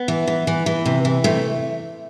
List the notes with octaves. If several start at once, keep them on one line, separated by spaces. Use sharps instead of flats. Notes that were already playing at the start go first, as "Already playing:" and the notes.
Already playing: B3
E3
E3
E3
E3
C3
E3
C3 A3